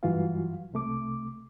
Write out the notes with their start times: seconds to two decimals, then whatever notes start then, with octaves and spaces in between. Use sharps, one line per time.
0.03 G2 E3 F#3 F4 F#4 F5
0.72 C2 C3 A3 D6